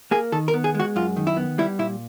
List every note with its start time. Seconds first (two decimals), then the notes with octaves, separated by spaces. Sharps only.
0.11 A#3 G#4
0.32 D#3 A4
0.48 A#4
0.54 B3
0.64 G#4
0.74 G#3
0.80 F#4
0.96 F#2 F4
1.16 D#3
1.27 E4
1.37 B3
1.58 G3 E4
1.79 A#2 E4